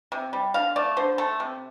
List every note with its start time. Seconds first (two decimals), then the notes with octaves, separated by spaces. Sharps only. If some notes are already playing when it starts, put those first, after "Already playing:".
0.12 C3
0.33 G3
0.54 D3 F5
0.76 A3 D5
0.97 D3 C5
1.18 A3 A4
1.40 C3